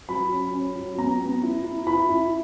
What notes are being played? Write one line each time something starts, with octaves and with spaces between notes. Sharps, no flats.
F#3 B5
C#4
C#4
F#3
B3 A#5
B3
E4
E4
E4 B5
E4